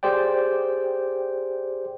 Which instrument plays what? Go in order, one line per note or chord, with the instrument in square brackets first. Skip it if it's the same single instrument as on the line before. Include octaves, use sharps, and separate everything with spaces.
[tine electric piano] G4 G#4 C5 D5 G5